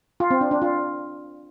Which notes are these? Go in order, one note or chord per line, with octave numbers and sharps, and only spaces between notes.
F4
C4
D4
D4
F4